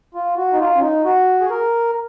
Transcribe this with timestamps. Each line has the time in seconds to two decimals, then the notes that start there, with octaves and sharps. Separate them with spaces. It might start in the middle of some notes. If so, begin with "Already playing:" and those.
0.14 F4
0.37 F#4
0.53 D#4
0.59 F4
0.76 C#4
0.82 D#4
1.05 F#4
1.40 G#4
1.50 A#4